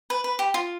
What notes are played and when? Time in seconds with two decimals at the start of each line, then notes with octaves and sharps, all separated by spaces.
0.10 B4
0.24 B4
0.39 G4
0.54 F4